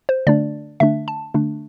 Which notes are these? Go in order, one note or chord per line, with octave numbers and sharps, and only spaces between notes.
C5
D3 A3 D4 D5
D3 A3 D4 E5
A5
D3 A3 D4